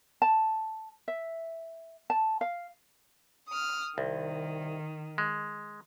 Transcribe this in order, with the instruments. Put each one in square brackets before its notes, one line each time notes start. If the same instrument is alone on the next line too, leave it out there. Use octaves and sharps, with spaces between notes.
[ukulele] A5
E5
A5
F5
[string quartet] D#6 F6
[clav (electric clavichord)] C2 [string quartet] D#3
[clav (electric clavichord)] G#3